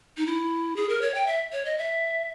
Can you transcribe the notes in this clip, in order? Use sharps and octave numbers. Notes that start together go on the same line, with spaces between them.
D#4
E4
G#4
A#4
C#5
G5
E5
C#5
D#5
E5